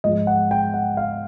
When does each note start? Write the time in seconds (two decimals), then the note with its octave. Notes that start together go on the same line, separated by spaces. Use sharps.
0.04 G#2 F3 G#3 D#5
0.27 F#5
0.51 G5
0.74 F#5
0.97 F5